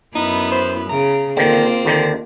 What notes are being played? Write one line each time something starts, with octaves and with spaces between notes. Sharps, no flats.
F#2 B3 D#4 E4
C5
C#3 A#5
D3 D#3 A#3 C4 F4
D#2 D3 D#3